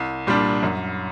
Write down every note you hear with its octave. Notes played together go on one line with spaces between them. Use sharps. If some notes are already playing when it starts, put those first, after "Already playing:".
Already playing: C2
A#2 G3 D4
F#2